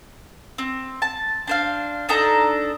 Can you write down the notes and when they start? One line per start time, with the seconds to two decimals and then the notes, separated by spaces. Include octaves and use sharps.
0.58 C4
1.02 A5
1.47 D4 C5 F5
2.09 D4 D#4 A4 A#5